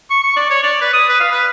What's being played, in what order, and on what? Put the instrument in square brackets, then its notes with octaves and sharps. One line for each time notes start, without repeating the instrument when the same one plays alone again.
[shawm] C#6
C#6
D5
C#5
D5
B4
D#6
B4
F5
B4